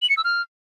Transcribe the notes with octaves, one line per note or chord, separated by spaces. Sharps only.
F#7
C#7
E6
F6